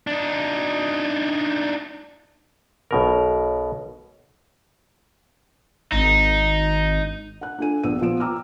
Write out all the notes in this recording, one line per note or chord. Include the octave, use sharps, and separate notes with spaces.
D4 D#4
B1 B2 A#4
G#1 D#4
F#5 F#6
D4 F4 A4 G#5 D#7
A#1 B3 E6 D#7
A#2 F3 B3 D7 E7
G5 A#5 D6 E6 F6